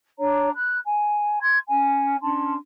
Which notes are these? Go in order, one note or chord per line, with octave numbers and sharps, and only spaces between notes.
D4 C#5 A#5
B5 F#6
G#5
C6 G#6
C#4 G#5
C#4 D4 A5 C6